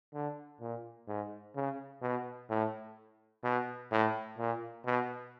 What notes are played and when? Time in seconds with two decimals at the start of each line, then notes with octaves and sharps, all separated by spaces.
0.14 D3
0.61 A#2
1.08 G#2
1.55 C#3
2.02 B2
2.50 A2
3.44 B2
3.91 A2
4.38 A#2
4.86 B2